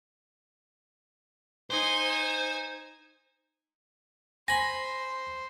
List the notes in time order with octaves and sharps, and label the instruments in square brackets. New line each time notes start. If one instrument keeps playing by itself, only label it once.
[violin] D#4 G#5 [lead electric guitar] C5
[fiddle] C5 [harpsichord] G#5 B5 [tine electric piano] A#6